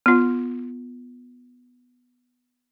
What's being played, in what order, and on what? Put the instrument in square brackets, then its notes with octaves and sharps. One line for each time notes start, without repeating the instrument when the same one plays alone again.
[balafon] B3 F4